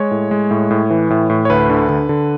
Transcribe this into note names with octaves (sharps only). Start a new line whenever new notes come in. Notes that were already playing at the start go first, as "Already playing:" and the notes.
Already playing: G#3 C#5
A2
G#3
A2
A2
E3
A2
A2
C#5
D2 B4
D3
D3
D3